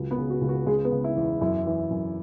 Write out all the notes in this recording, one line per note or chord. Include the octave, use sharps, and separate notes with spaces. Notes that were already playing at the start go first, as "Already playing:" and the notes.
Already playing: C#2 F#3
B3 B4
C#3
F#4
C#2
F#4
C#3 G#3 G#4
B3 B4
C#3
E4
E2
F#2 E4
E3
F#2